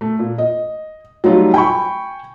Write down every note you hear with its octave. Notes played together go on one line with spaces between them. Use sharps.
A3
A#2
D#5
F#3 G3 A3 D#4 F4 F#4
G5 G#5 B5 C#6